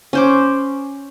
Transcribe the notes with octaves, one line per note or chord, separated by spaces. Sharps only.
C#4 C5 D6